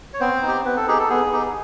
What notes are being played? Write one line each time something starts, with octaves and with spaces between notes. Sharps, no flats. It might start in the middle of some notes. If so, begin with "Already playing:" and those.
C#5
B3 C4 C5
D#4
G4
B3 B4
A4
D#4 G4 G#4
A4
B3 G#4
D#4 G4